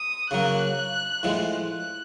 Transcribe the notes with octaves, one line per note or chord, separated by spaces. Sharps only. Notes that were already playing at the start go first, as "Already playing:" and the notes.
Already playing: D#6
C#3 F#3 A#3 F#6
A2 F3 G#3
F#6